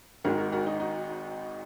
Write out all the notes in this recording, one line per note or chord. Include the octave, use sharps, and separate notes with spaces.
G#1 G#2 D#3 G#3 F#4 A#4
F#4 A#4
F#4 A#4
D#4 F#4
D#4 F#4